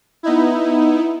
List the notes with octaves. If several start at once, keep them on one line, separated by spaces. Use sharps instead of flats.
B3 D#4 E4